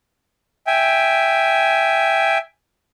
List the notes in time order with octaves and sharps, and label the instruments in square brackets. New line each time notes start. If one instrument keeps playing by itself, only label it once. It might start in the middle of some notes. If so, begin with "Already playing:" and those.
[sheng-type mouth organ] E5 G5 G#5